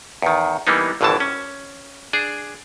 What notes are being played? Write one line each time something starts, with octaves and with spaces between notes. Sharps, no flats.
E2 D#3
E3 G3 A#3 B3 D#4
G#1 G2 B2 D3 E3 A5
C#4
D4 G#4